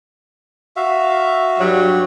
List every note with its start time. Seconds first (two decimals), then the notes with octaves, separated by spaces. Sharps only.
0.76 F#4 E5 F5
1.59 G2 F#3 G3